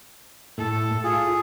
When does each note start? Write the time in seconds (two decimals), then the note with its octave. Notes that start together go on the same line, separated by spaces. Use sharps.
0.58 A2 A4
1.04 F4 G#4